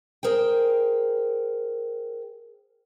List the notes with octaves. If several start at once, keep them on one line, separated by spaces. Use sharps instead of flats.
G#4 A#4 C5 G5